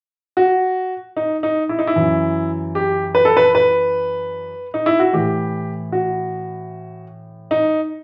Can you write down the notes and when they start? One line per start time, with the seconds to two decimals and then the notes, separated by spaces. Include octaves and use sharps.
0.37 F#4
1.17 D#4
1.43 D#4
1.69 E4
1.79 D#4
1.87 E4
1.96 F#2 E3
2.75 G4
3.15 B4
3.25 A4
3.37 B4
3.55 B4
4.74 D#4
4.86 E4
4.99 F#4
5.13 A2 E3 G4
5.92 F#4
7.51 D#4